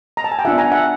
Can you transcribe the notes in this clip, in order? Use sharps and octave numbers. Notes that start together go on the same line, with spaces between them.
A#5
A5
G#5
G5
B3 D4 F4 E5 F#5
G#5 A#5
E5 F#5